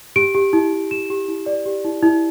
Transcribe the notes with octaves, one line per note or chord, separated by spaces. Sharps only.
G4 D7
G4
E4
E4
G4 E7
G4
E4
D5
G4
E4
E4